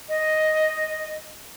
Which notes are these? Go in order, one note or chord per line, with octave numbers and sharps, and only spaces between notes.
D#5